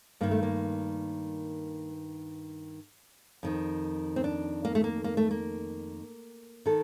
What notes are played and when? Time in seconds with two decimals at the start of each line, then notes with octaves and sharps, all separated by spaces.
0.21 G2 D#3 A#3
0.31 A3
0.43 A#3
3.43 F2 D#3
4.16 C4
4.24 D4
4.65 A#3
4.75 A3
4.84 A#3
5.04 A#3
5.17 A3
5.31 A#3
6.66 D#3 A4